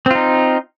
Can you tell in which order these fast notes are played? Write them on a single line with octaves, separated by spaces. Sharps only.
C4 F4 D#4